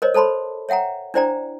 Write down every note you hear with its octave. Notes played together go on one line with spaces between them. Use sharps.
A#4 C5 C#5 D#5
A4 C5 A5 B5 C6
C#5 E5 F#5 G5 A#5
D4 E4 C5 D5 G5 A#5